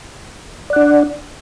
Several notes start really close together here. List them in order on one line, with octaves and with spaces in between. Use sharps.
D5 F#5 D4